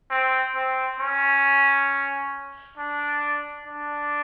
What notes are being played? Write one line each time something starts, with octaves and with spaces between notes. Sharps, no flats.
C4
C4
C#4
D4
D4